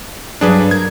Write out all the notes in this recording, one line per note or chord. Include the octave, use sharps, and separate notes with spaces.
G2 F#3 D4 G#4 A4 B4
A#4 G#6